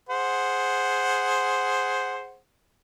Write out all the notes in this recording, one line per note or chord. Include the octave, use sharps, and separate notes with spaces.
G#4 C5 F#5